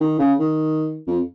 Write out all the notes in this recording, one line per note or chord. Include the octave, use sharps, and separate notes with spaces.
D#3
C#3
D#3
F2